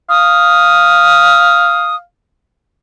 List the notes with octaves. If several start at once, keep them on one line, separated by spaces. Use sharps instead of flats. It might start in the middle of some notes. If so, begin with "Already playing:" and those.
F5 D#6